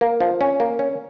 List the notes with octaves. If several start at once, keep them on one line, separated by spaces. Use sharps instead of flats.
A#3
F3
C#4
A#3
C#4